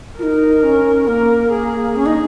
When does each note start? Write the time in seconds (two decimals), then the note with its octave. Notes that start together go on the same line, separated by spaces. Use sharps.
0.19 D#4 F4 A#4
0.64 C#4
1.07 A#3 A#4
1.52 G#4
1.96 C#4 G#4
2.06 D#4